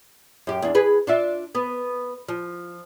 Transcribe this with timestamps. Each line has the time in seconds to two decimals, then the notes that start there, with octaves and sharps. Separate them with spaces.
0.47 F#2 G4
0.62 E2 D4
0.75 G#4 B4
1.07 D4 F4 E5
1.55 B3
2.28 F3